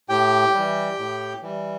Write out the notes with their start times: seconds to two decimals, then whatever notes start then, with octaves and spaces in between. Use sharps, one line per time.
0.09 A2 G4 G5
0.54 E3 G3
0.98 A2
1.42 E3 G3